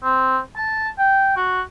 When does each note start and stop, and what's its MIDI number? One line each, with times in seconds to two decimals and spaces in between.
0.04 0.38 60
0.56 0.88 81
0.99 1.34 79
1.37 1.61 66